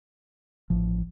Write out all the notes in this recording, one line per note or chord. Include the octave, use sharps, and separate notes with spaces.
A1 A2 F3